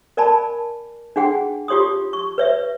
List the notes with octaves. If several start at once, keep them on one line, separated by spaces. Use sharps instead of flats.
A#4 D5 G#5 A5 B5
D4 F#4 G#4 F#5 G5
F4 G4 C#5 C6 D#6
C#6
B4 C#5 E5